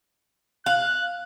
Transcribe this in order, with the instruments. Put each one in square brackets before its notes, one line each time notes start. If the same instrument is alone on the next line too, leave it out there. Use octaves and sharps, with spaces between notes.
[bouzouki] F5 [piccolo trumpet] F#6